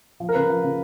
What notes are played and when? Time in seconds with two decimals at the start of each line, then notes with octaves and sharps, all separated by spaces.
0.20 F3
0.29 A#4
0.35 C#3 B4
0.50 F3
0.64 C#3